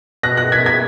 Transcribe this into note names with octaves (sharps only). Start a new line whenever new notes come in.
B2 F#6 A#6
F#6 A#6
G#6 B6
G#6 B6